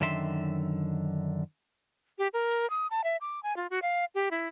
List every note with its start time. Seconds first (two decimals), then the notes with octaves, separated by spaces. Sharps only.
0.01 F#2 D3 D#3 E5 C6
2.19 G4
2.33 A#4
2.70 D#6
2.91 A5
3.04 E5
3.21 D6
3.43 G#5
3.57 F4
3.70 F#4
3.82 F5
4.15 G4
4.31 E4